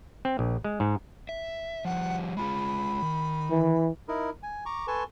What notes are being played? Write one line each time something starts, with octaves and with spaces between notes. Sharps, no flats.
C4
A#1
G#3
G#2
E5
F3 G3 F#5
G#3 F4 G#4 B5
D#3
E3
D#4 E4 A#4
G#5
A#5 C#6 D6
A4 B4 G#5 A5 C6 C#6